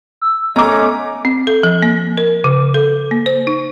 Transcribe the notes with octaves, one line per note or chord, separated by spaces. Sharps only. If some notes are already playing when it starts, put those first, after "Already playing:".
E6
A3 B3 C#4 D#5 A#5 D6
C4
A4
F3
A#3
A#4
C#3
A4
A#3
C5
D#4